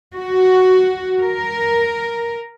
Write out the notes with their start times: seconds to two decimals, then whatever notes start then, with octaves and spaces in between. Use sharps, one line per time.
0.17 F#4
1.20 A#4